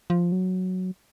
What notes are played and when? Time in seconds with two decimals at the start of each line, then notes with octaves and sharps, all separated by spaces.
0.10 F3
0.32 F#3